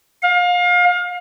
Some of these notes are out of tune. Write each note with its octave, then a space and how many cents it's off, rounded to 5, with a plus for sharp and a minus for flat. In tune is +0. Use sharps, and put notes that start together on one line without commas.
F5 +30